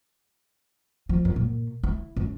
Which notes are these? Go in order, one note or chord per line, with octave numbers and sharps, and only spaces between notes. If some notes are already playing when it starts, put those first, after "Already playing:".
F3
F#2
A#2
E4
F#2